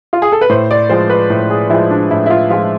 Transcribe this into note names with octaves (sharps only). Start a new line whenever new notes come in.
F4
G#4
A4
B4
A2 C5
D5
F3 G#3 C5
B4
A2
G#4
F3 G#3 E4
D4
A2 E4
E4
F4
F3 G#3 F4